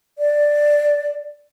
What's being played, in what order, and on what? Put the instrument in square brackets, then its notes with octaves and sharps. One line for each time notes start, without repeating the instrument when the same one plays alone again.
[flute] D5